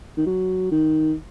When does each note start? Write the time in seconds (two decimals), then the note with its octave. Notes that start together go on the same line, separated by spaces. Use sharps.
0.17 D#3
0.26 F#3
0.72 D#3